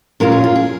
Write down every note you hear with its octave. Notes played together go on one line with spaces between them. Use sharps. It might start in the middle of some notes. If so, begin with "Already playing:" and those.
A#2 G#3 C#4 F4 A#4
G#4
F4
G#4